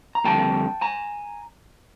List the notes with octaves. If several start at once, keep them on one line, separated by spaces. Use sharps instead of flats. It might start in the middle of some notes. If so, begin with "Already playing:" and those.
A#5
F2 D3 G3 A#3 G5 A5
G#5 A#5